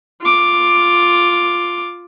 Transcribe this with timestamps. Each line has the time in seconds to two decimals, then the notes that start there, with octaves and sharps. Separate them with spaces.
0.22 F4 D6